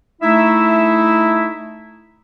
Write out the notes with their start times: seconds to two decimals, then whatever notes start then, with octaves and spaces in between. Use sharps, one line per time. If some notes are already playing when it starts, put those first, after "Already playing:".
0.22 A3 D#4 E4 E5